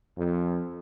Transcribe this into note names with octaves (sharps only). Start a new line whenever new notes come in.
F2